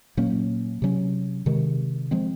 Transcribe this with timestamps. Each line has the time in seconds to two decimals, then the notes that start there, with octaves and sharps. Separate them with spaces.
0.17 A#2 F#3 A#3 C#4
0.82 C3 F#3 C#4
1.46 C3 D#3 G#3
2.11 F3 G#3 C4